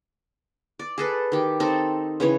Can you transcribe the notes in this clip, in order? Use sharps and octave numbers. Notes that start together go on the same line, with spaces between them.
D5
G#4 A4 B4
D#3 G4
C4 D#4 A4
C#3 E3 C#5